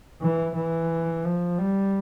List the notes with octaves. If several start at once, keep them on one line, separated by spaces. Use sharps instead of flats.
E3
E3
F3
G3